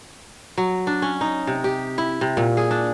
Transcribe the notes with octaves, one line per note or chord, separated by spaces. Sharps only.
F#3
D4
C#4
D#4
C3
G4
E4
C3
A#2
G#4
D4